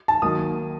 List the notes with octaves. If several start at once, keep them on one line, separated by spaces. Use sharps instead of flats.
A5
D#3 F#3 A#3 D#6